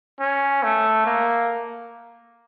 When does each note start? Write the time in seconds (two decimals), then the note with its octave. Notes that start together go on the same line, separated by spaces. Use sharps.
0.20 C#4
0.63 A3
1.06 A#3